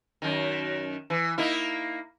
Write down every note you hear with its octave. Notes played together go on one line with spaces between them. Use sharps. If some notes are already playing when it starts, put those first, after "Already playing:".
F#2 D#3
E3
A#3 D#4 E4